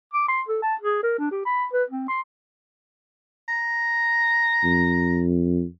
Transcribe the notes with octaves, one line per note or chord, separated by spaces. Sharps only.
D6
C6
A4
A5
G#4
A#4
D4
G4
B5
B4
C4
C6
A#5
F2